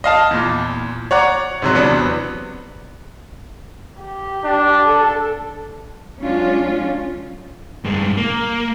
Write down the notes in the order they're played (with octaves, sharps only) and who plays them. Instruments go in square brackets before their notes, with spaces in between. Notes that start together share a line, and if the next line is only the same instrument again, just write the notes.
[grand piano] D#5 F5 A5
E2 A#2
C#5 D5 F#5 A#5
G#2 C3 F#3
E2 C3 F#3 B3 D4
[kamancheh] G4
[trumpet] D4
[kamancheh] A4
[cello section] F#3 G#3 C#4 D4 F4
[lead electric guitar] G2 G#3
A#3